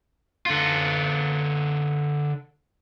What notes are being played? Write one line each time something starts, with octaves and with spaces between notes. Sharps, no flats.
D3 F4